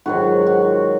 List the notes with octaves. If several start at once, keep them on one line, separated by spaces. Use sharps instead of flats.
G#2 D#3 F#3 F#4
F#4